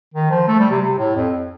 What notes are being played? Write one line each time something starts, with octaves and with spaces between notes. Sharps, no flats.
D#3
F3
A3
G3
C3
C3
A2
F2